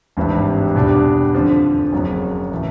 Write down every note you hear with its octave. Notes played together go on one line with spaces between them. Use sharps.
G#1 G2 E3 G3 C4
E2 B2 G3 B3 D4
F2 D3 F3
F#1 F2 C#3 F#3
A2 E3 A3